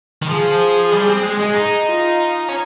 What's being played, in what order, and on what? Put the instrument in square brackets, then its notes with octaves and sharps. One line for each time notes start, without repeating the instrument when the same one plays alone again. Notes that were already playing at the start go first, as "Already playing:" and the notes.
[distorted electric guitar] D#3
[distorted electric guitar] F3 [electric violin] G#4
[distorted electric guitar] G3
C4
[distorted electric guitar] G#3 [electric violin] G#4
[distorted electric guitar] G#3
D#4
[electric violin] F4
[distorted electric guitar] C#4